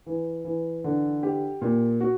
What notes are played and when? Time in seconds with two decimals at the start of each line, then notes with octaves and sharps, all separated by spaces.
0.06 E3
0.44 E3
0.84 D3
1.23 G4
1.62 A#2
2.01 F#4